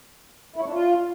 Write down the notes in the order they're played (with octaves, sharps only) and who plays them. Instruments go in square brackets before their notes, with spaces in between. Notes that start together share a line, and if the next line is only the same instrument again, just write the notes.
[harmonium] E4
C#5
D4
F4